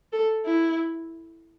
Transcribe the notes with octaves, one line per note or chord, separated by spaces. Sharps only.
A4
E4